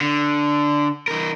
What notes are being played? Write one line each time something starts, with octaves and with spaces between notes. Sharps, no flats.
D3
E3 A#4